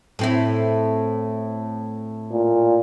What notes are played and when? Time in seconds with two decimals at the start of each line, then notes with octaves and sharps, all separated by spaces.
0.19 A2 C4 E4
2.31 A#2